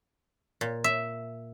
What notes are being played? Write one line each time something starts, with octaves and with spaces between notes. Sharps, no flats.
A#2
E5